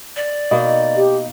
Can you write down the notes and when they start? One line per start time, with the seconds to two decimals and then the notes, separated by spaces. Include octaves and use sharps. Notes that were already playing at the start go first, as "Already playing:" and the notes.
0.16 D5
0.51 B2 A#3 D#4 D#5
0.96 G4